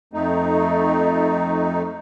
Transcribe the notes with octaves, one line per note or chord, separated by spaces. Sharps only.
F2 A3 D#4